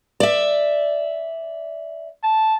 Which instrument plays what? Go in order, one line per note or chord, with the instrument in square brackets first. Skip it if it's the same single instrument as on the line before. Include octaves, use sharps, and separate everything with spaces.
[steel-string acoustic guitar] D5 E5
[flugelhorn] A5